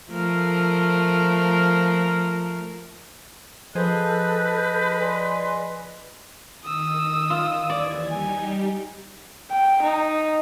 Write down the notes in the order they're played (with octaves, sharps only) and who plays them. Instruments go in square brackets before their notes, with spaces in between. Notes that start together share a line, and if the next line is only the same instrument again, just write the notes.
[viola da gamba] F3 A3 A#4
[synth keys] F3 G#4 C5 [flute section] A4 F#6 G6 [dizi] B4 [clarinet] D#5
[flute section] D5 G#5 C6
[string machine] D#3 [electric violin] D#6 E6
[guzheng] F4
[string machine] D#2 E3 G#6 [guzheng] D5
[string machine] G3 D#4 G4 [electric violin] G#5
[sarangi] G5
D#4